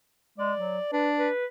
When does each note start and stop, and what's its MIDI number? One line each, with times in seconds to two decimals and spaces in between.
0.38 0.53 56
0.38 0.91 74
0.58 0.78 54
0.92 1.28 62
0.92 1.09 71
1.18 1.46 71